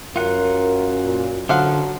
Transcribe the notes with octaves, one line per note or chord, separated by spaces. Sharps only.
F#2 F4 A#4 F#5
A#2
D3 F3 F#3 F5 F#5